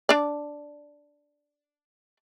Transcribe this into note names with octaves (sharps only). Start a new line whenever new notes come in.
D4 D5